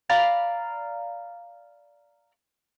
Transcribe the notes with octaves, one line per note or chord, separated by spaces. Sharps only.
D5 F5 A#5 B5